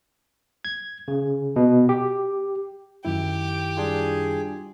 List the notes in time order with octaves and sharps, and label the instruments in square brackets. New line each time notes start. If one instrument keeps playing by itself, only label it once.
[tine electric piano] G#6
C#3
B2
G4
[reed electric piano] F#2 D#3 E4 [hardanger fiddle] G4
[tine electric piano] G3 D4 F4 [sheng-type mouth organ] G#4